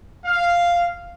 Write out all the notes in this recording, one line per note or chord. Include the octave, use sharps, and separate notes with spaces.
F5